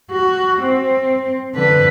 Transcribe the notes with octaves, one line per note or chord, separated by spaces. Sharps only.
F#4
C4
D3 B4